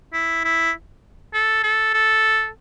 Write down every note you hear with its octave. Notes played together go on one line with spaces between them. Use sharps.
E4
E4
A4
A4
A4